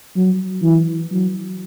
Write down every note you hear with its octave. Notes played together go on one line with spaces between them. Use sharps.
F#3
E3
F#3